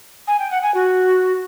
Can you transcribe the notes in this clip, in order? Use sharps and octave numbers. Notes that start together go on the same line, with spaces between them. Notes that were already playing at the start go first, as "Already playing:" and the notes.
G#5
G5
F#5
G#5
F#4